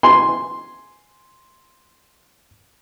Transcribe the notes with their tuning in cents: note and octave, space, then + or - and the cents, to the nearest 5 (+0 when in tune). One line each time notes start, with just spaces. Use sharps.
G#5 +0 C6 +0